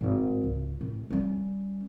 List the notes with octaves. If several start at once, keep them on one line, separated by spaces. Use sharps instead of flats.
G#1 A2
C#2
A2
G3 C#4